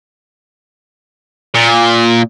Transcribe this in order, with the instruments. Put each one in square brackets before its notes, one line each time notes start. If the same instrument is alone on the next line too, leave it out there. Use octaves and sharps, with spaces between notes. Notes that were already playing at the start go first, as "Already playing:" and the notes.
[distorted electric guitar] A#2